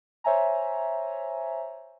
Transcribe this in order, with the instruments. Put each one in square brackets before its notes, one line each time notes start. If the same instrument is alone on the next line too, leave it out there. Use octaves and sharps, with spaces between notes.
[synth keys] C5 C#5 E5 G#5 A#5